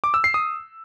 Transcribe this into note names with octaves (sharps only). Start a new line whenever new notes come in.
D6
E6
C7
D#6